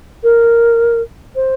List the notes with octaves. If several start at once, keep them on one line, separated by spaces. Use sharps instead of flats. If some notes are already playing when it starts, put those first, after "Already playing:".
A#4
C5